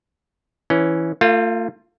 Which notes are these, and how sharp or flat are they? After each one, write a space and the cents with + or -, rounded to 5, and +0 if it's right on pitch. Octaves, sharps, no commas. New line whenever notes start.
E3 +0 C#4 +5
A3 +45 F4 +0